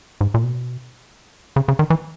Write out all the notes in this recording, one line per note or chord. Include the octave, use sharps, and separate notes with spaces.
G#2
A#2
B2
C#3
C#3
D#3
E3